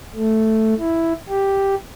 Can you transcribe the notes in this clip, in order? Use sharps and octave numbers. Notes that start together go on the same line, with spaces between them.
A3
E4
G4